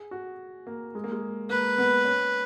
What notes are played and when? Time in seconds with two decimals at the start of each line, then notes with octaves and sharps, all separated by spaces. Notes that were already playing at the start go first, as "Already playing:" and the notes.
Already playing: G#4
0.11 F#4
0.67 A#3
0.95 G#3
1.04 A#3
1.12 G#3
1.50 A#3 B4
1.78 B3
2.05 C#4